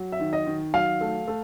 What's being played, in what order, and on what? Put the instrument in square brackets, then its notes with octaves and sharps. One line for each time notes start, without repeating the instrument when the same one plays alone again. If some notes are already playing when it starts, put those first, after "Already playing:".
Already playing: [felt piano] F#3
[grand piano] E5
[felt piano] D#3
[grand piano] D#5
[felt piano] D#3
[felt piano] F#3 [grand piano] F5
[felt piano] A3
A3